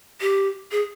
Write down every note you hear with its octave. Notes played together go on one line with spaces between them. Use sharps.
G4
G#4